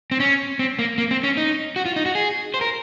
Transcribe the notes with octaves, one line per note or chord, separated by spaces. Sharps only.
C4
C#4
C4
A#3
A#3
C4
C#4
D#4
F#4
F4
D#4
F#4
G#4
C5
A#4